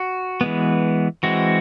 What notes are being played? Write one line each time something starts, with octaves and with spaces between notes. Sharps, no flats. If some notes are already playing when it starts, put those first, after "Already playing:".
Already playing: F#4
E3 G#3 B3
E3 G#3 C4 F#4